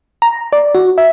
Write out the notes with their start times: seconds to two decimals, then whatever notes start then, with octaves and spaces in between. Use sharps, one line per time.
0.22 A#5
0.53 D5
0.75 F#4
0.98 E5